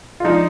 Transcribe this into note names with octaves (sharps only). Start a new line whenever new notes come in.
F4
F3 G#3 D4 D#4